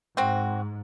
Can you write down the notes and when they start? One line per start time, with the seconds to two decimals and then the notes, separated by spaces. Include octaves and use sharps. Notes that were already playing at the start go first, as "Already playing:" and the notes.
0.17 G#2 C4 F#4